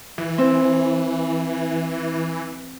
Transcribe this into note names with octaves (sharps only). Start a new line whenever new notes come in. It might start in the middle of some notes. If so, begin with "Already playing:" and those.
E3
C4